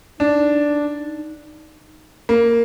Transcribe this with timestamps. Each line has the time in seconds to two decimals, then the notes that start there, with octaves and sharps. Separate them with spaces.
0.19 D4 D#4
2.29 A#3